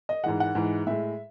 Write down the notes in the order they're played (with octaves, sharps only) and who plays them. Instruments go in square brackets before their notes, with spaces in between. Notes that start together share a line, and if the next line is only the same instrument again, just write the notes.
[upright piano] D#5
G#2 E3 G#3 F#5
F#5
G#2 E3 G#3
A2 G#3 E5